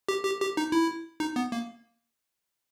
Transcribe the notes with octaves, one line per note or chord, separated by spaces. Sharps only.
G4
G4
G4
D#4
E4
D#4
B3
A#3